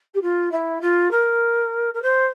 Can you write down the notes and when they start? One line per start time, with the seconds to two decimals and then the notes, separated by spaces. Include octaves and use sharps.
0.14 G4
0.21 F4
0.51 E4
0.81 F4
1.11 A#4
1.94 A#4
2.02 C5